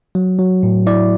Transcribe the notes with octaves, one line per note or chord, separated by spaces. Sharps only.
F#3
F#3
A2
E4 D5